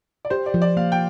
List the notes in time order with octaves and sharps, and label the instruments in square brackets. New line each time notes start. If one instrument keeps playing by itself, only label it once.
[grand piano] D5
[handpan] G4 [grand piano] C5
[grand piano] D5
[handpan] F3
[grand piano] D5
[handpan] A#3 [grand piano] F5
[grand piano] G5